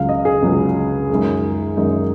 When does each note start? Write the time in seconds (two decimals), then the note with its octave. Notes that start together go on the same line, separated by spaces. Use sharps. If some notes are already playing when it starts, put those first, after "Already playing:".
Already playing: C#2 C#3 F#3 F5
0.09 D#5
0.25 G#4
0.42 C#2 C#3 F#3
1.09 F#2 D#3 G#3
1.77 F#2 D#3 G#3 D#4